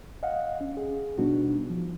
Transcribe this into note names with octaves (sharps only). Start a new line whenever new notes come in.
D#5 F5 F#5
C#4
G#4
B2 G3 B3 D4 D#4 F#4
F3